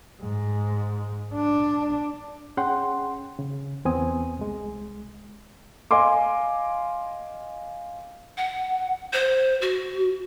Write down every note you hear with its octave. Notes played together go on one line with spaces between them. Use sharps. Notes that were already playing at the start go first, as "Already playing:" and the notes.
G#2
D4
C#4 G#4 F#5 G5 C6
C#3
E2 B3 C4 G#5 D#6
C2 G#3
D#5 F5 G#5 C6 D6
F#5
C5
F#4